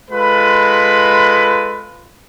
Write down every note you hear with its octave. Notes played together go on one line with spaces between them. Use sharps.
G#3 F4 A4 B4 B5